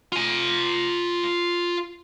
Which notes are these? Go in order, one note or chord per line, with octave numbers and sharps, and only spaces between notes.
F4 G#5